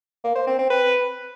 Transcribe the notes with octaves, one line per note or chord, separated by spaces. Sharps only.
A#3
C5
C4
C4
B4